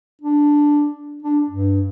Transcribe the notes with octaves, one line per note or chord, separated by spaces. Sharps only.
D4
D4
G2